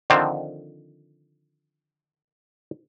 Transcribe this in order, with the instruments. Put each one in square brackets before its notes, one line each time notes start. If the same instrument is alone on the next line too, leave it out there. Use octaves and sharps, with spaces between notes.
[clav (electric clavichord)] D3 D#3 F3 C4